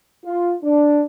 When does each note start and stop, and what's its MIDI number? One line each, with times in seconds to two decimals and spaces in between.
0.25 0.53 65
0.63 1.02 62